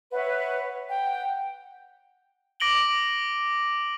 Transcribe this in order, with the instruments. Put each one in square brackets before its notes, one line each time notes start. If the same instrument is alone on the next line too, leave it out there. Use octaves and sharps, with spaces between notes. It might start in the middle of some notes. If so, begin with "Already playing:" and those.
[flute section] B4 C#5 E5 F#5
F#5 G5
[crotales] D6 A#6 D7 F#7 G7